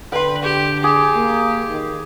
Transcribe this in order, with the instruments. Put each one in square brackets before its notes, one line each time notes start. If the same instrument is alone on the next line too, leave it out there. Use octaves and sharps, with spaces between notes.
[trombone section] D3 [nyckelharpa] B4 [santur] G5 C6
[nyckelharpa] G4
[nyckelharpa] G4 [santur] G#4 [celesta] D6
[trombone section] A#3
D#3